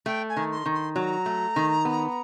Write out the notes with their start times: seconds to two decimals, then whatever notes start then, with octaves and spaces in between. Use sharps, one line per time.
0.06 A3 G5
0.29 G#5
0.37 D#3
0.51 C6
0.66 D#3
0.73 C6
0.96 F#3 A#5
1.26 A3
1.56 D#3
1.85 B3